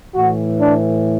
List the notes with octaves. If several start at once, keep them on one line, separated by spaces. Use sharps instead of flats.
A2 E3 F#4
D4